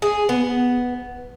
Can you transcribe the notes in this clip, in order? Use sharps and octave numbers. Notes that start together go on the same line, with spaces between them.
G#4
B3